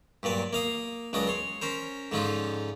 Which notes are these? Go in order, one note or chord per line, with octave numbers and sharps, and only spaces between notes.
G2 A#2 F#3 D5
A#3 F5 D#6
C#2 C#3 F#3 D4 D#5 D#6
C#5 C6
C#4 A#4 C5
G#2 D3 F3 C#4 D#4 F4